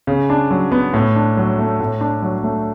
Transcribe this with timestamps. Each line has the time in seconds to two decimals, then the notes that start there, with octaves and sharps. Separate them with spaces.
0.07 C#3
0.30 D4
0.51 F#3
0.72 B3
0.94 A2
1.16 D4
1.37 F#3
1.58 A3
1.80 A2
2.01 D4
2.22 F#3
2.44 A3